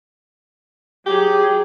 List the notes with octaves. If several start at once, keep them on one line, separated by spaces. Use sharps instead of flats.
F#3 G4 G#4